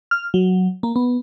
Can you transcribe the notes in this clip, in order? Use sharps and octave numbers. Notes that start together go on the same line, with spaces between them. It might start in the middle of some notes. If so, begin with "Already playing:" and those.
F6
F#3
A#3
B3